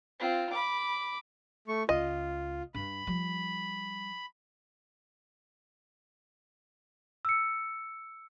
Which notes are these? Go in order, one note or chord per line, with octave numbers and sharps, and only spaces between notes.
C4 F4
B5 D6
A3 C#6
C#2 F4 D#5
G2 B5
F3 G3
E6 C#7